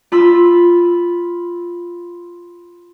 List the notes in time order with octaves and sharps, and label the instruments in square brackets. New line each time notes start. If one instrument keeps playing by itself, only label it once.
[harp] F4 B5 E6